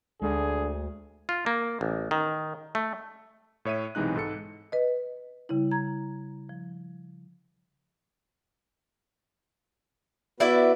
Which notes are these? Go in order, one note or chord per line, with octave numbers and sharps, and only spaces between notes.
D2 D3 G#3 G#4
F4
A#3
A1
D#3
A3
A2 C#5 E5 D#7
B1 C3 E3 G#3 D#4 F#6
G#2 A4 C#7
B4 D#5
C#3 G3 E4
E4 A#5 G#6
F3
B3 E4 F#4 B4 D5 E5